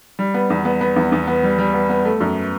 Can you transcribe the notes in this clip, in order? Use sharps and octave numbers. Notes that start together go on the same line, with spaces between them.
G3
B3
E2
B3
B3
E2
E2
B3
G3
G3
B3
B3
A3
F#2